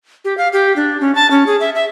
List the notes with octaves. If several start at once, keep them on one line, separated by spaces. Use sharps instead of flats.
G4
F5
G4
D4
C#4
A5
C#4
G#4
E5
E5